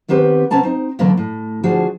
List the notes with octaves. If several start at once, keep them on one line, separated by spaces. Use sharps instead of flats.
D#3 B3 C4 G4 B4
C3 B3 C#4 A5 A#5
C4 D#4
B2 D3 E3 F#3 A#3 B3
A2
D2 F3 D4 F#4 G#4